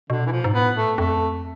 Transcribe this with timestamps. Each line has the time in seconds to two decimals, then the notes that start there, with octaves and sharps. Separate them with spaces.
0.10 B2 D3
0.27 E3
0.32 F3
0.44 G#2
0.54 A2 B3
0.76 A3
0.97 F2 A3